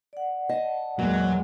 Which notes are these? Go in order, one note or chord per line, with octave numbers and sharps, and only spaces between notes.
D5 F#5
D#5 A5
E2 A#2 F#3 G#3